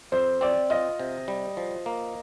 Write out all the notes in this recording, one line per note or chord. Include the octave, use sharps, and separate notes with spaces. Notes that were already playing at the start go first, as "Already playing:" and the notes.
F2 C5
C4 D5
F4 D#5
C3
G3
F3
A#3